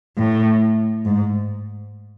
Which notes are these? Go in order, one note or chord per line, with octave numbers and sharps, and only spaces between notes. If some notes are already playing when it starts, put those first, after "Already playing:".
A2
G#2